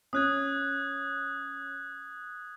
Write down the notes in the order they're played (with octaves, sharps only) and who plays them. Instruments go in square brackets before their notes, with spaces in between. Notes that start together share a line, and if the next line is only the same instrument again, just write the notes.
[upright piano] C#4 [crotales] D#6 F#6 G#6